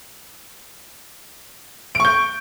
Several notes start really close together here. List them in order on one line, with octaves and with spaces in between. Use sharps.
D7 C#6 G6